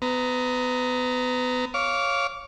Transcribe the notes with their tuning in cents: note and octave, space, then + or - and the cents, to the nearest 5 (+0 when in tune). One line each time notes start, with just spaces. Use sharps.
B3 +30 A#5 +0
C#5 +0 F5 +0 D6 -20